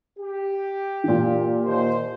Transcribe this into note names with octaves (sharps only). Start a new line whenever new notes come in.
G4
A#2 E3
D#2 C5